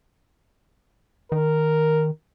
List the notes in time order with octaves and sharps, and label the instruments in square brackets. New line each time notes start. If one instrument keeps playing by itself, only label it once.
[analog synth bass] D#3 [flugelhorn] A#4